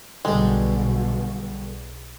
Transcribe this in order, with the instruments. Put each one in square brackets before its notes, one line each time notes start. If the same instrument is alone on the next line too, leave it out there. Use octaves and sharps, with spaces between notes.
[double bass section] B1 B2 [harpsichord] D3 G3 [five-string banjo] G#3